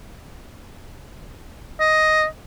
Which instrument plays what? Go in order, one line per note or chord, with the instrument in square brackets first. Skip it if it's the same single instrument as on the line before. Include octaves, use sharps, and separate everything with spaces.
[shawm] D#5